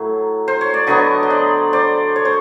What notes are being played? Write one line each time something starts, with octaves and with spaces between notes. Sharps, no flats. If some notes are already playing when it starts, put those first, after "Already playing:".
Already playing: A2 F#3
C5
C#5
D5
D3 F#3 B3 C#5 D#5
D#5
C5 D5
C5 D5
C#5
C5